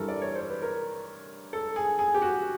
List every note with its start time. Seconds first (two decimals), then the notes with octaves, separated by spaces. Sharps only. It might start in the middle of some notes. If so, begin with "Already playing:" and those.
Already playing: G2 E3 G3 A4 A#4
0.08 D5
0.22 C#5
0.35 C5
0.49 B4
0.62 A#4
1.53 A4
1.76 G#4
1.99 G#4
2.14 G4
2.22 F#4